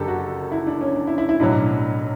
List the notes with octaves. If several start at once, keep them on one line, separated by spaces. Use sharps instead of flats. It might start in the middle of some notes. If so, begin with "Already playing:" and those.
Already playing: F#1 F#2 D3 G4 A4
F#4
E4
D4
C#4
D4
E4
E4
E4
B1 A2 F#3 D4